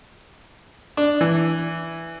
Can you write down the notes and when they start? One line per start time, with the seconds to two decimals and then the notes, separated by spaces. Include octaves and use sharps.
0.97 D4
1.21 E3